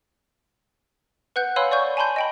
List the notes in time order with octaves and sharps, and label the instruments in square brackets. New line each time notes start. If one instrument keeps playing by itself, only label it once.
[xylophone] B4 F#5 F#6 G6
C#5 F5 G#5 B5 C6 E6
D5 C#6 G6
G#5 A5 B5 C6 G6
D#5 G5 B5